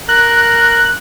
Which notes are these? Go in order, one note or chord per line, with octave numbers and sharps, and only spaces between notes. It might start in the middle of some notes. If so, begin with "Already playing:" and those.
A#4 F#6